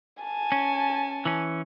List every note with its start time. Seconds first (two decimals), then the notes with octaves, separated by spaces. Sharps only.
0.23 G#5 A5
0.52 C#4
1.25 E3 C#4